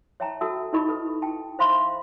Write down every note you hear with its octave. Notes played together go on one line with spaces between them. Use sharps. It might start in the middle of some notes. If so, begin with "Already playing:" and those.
C#5 E5 G5 A5 A#5
F#4 A4 E5 A5 E6
D#4 E4 A#4 D#5 B5 C#6
A4 B4
G5 A5
C5 E5 F5 B5 C6